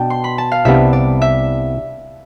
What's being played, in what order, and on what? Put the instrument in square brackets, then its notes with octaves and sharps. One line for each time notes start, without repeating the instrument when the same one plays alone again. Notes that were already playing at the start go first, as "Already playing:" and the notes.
Already playing: [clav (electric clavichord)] B2 B3 D4 [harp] G5 A5
[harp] C6
B5
A5
F5
[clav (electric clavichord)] C2 C3 G3 B3 D4 [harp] E5
[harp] D5
E5